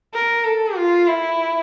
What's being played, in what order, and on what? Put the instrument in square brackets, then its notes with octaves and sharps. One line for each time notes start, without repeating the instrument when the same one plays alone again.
[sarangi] A#4
A4
F4
E4